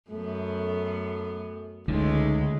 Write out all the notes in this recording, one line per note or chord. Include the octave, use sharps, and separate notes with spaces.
F#2 A3 B3
C#2 D3 G#3 A3 D#4